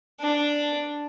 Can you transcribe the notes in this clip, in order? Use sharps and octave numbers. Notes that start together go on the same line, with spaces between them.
D4